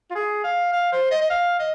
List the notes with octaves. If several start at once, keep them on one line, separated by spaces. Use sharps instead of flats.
F4
G#4
F5
F5
C5
D#5
D#5
F5
D#5